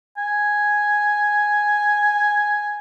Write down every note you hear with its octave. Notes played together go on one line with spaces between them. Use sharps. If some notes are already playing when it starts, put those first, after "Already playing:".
G#5